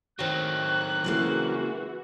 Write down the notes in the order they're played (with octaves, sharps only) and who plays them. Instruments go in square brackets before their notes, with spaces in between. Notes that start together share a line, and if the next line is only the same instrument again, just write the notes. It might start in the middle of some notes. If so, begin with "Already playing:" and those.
[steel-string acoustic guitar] D#3 C#5 [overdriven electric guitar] F#3 C4 [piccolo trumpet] F#6
[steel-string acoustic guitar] C#3 G#3 A#3 [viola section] E3 F#4